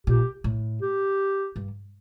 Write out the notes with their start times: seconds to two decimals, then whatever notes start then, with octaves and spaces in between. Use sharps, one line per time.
0.07 A#2 G4
0.44 A2
0.82 G4
1.56 G2